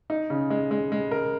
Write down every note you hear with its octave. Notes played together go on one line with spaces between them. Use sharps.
D#4
C#3
G#3
G#3
G#3
A#4